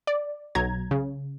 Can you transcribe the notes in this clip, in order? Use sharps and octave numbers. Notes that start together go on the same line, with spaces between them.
D5
B1 F#3 A#5 G#6
C#3